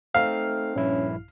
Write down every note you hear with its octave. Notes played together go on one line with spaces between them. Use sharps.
A3 C4 D#4 F5
A#1 G2 C#4 E4